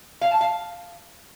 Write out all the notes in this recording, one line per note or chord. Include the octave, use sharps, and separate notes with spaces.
F5
A5
F5